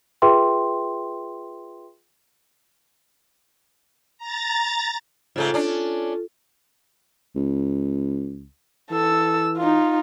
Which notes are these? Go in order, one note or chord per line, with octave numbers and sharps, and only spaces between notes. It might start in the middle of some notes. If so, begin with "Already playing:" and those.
F4 G#4 B4 E5 G5 C6
A#5 A6
G#2 C#3 A3 F4 A4
C#4 D4
C#2
E3 A4 E6
D#4 F4